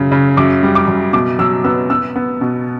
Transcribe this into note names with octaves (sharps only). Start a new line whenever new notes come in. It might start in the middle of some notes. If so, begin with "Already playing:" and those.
Already playing: F#2 C#3
C#3
F#2 D6
G3
D6
F#2
B2 D6
F#3 E6
B3 E6
B3 E6
B3
B2